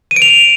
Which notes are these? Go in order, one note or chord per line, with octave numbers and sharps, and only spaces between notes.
D#7
D7
F7